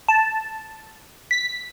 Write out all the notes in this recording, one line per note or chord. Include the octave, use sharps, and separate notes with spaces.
A5
B6